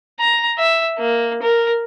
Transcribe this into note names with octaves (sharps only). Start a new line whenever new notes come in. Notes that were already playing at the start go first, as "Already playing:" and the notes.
A#5
E5
A#3
A#4